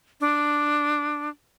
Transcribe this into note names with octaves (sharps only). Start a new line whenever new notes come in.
D4